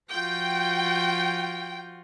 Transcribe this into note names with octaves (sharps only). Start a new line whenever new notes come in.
F3 F4 F#4 G5